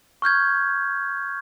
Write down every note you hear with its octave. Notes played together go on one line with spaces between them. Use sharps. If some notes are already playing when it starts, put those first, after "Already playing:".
C#6 F6 G6 G#6